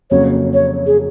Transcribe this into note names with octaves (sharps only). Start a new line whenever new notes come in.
F2 C#3 F#3 A#3 C#5
C#5
G#4